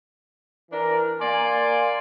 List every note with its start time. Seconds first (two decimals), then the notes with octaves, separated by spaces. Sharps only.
0.71 E3 D4 A#4
1.21 A#3 D5 G#5 C6